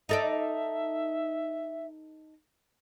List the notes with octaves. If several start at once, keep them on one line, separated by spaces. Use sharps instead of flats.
D#4 A4 D5 E5